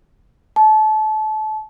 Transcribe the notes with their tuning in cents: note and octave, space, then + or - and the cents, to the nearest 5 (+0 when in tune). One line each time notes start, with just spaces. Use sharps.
A5 -30